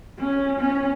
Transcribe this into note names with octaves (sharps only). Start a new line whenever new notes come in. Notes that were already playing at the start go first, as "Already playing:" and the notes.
C#4
C#4